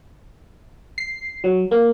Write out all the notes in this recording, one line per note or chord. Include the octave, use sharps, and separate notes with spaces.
C7
F#3
A#3